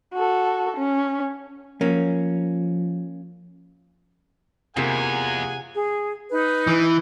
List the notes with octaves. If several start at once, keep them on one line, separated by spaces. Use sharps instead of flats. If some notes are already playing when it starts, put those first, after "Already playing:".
F#4 A4
C#4
F3 A#3 C#4
E2 C3 A#3 F4 G#4 F#5 G#5
G#4
D#4 B4
E3